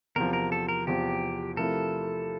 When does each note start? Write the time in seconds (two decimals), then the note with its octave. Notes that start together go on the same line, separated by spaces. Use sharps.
0.16 E2 C3 F3 A#4
0.33 A#4
0.52 A4
0.69 A#4
0.87 E2 C3 F3 G4
1.57 C3 F3 A3 E4 A4 A#4